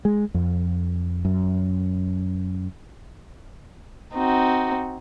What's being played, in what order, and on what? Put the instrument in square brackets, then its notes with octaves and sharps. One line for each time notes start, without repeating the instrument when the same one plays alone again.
[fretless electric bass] G#3
F2
F#2
[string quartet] C4 D#4 F#4